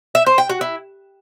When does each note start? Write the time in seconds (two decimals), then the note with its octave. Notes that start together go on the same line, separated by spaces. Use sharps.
0.15 E5
0.26 C5
0.38 G5
0.49 F#4
0.61 E4